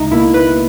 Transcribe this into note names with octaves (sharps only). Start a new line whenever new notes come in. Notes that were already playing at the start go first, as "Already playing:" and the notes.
Already playing: C#2 D#4 E4
B2 A#3 E4
B4